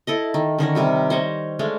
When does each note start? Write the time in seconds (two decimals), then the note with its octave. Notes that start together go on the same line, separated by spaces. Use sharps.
0.07 E4 A4 D#5
0.34 D#3
0.59 D3 D#3 C#4 A#4
0.75 C3 G3 C4
1.10 C5 C#5 D#5
1.59 G#3 A3 D4 F5